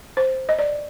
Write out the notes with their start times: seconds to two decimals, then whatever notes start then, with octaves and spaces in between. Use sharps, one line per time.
0.17 C5
0.49 D#5
0.59 D5